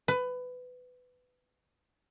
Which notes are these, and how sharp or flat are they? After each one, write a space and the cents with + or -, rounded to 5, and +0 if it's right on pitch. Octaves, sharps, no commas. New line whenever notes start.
B4 +20